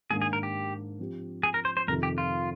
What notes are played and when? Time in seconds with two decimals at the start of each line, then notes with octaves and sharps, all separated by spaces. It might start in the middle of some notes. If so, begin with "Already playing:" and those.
0.11 G#2 D#3 A#3 D4 G#4
0.22 G#4
0.33 A#4
0.43 G4
0.99 F3 C4 G4
1.43 G#4
1.54 A#4
1.65 C5
1.77 C5
1.88 F2 C3 D#3 A#4
2.03 G4
2.18 F4